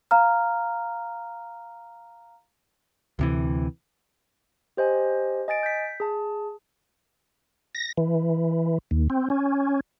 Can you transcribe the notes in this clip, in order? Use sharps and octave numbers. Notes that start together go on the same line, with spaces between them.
F5 A#5 F6
D2 C3 E3
G4 C5 D#5 G#5
D#5 G#5 A6 D7
G6 B6
G#4 A5
A#6
E3
D#2
C4
C#4